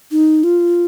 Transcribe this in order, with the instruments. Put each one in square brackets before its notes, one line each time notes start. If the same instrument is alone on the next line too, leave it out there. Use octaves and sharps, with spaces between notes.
[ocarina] D#4
F4